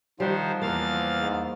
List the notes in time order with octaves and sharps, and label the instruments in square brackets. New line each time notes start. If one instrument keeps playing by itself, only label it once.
[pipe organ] D#3 C5 [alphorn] F3 [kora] G3 F#5
[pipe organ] E2 F5 A6 [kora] A#3
[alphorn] G#2